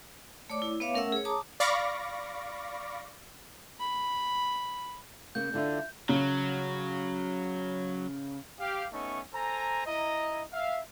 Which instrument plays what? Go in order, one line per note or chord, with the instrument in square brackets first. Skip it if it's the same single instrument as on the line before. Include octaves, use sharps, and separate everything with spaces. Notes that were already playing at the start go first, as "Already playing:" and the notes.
[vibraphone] A3 C#5 D5 D6
E4
B3 B4 C#5 E5 F5 D6
A3 C#4 A#4 E5 F#5 E6
G#4 C#5
A5 A#5 D6 D#6
[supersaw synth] D5 F5 B5 C#6 D6 A#6
[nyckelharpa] B5
[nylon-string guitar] C#3 A#3 [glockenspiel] G6
[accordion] D3 [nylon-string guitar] D4 E4 F4
[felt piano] C#3 [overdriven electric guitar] F#3
[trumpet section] G4 F5
A3 B3 C#4 D#4 E5 C#6
A4 C5 G#5 A#5
E4 D#5 A#5
E5 F5